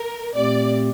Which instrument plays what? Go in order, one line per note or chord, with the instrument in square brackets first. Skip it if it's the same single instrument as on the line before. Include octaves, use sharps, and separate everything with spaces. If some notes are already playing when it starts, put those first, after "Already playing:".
Already playing: [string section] A#4
[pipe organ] A#2 A3 C4 G4 [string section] D5